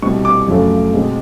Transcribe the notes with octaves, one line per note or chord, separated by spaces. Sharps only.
C2 B2 G3 C#6
D6
F#2 C#3 F3 A3 C#4
B2 G#3 C4